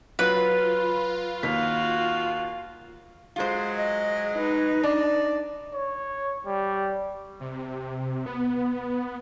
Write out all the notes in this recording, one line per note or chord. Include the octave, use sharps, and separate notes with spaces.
F#3 F4 B4
D#2 F#4 F5 B6
F#3 G#3 F4 C5
D#5
D#4 B4
D4 D5
C#5
G3
C3
B3